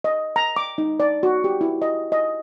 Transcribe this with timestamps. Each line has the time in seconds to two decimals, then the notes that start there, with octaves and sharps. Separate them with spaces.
0.04 D#5
0.36 A#5
0.57 D6
0.78 D#4
1.00 D5
1.23 F#4
1.44 G4
1.61 E4
1.82 D#5
2.12 D#5